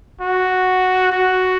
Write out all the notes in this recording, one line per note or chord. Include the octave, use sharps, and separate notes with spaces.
F#4
F#4